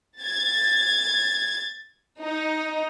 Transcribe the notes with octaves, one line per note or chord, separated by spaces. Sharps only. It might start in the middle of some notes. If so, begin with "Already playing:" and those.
G#6 A6
D#4